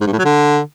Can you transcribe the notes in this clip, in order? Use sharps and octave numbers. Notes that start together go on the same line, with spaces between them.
G#2
G2
A2
F#3
D3